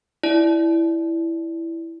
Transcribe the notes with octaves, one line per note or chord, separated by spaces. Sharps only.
E4 D5